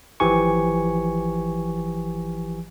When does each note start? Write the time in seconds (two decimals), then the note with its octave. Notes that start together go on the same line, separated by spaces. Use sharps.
0.20 G#1 E3 F3 G4 G#5 C#6